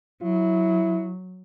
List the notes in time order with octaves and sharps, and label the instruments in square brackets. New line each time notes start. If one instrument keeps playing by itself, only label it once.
[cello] F#3 [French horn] E4